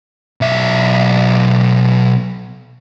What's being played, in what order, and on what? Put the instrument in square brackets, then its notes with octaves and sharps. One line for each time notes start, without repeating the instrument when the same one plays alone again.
[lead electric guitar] B1 E5